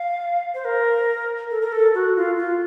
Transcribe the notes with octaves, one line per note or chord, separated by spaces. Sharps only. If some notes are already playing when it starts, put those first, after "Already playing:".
Already playing: F5
C5
A#4
A4
A#4
A4
F#4
F4
F4